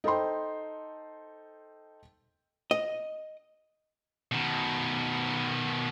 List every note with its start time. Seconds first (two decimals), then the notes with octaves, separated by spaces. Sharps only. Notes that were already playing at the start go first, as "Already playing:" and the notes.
0.04 D#4 A4 C5 G5 C6
2.71 D#5
4.32 B2 D#3